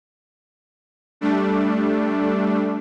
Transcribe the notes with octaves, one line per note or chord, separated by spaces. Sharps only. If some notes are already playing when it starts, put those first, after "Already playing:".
G3 A3 D4